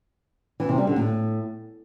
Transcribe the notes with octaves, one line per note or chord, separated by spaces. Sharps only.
E3
C3
G3
D3
A2